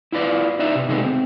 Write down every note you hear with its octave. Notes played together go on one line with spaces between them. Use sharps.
E4 F4 B4 D5
D#4 B4 D5 E5
C3
C3 D#3 G#3 B3 D#4 A4
C4